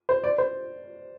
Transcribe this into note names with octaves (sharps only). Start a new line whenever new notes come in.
C5
D5
C5